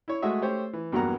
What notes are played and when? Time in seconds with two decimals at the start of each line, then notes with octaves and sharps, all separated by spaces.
0.08 E4 C#5
0.22 G#3 A3 F#4 G#4 E5
0.42 A3 G4 C5 C#5
0.73 E3
0.92 E2 G2 F#3 A#3 F#5 A#5